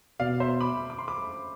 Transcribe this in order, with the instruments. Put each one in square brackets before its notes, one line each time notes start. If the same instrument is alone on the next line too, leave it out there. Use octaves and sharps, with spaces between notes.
[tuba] B2 [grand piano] D5 F5
[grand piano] C5 E5
B5 D6
D6
C6
B5 D6